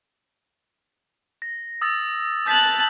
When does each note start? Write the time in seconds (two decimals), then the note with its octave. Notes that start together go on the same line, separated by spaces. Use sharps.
1.42 A#6
1.81 D#6 E6 A6
2.46 A5 D#6 F#6 G6 B6